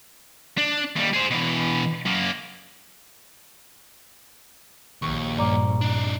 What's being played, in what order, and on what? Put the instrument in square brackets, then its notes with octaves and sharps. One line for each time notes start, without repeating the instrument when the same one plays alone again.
[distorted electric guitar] D4
D#2 G3
G#4 C5
B2 E3
F#2 A#3
[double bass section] A#1 [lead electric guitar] D#2 [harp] C#6
[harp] G2 [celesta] D5 A#5 D6
[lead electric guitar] D4 D#4